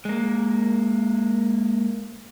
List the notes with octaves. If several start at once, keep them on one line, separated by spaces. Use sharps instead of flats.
G#3 A#3